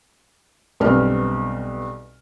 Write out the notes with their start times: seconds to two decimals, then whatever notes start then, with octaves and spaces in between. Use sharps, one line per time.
0.80 B1 G2 B3 C4 F6